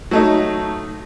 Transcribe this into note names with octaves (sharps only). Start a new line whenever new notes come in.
F#3 A3 D#4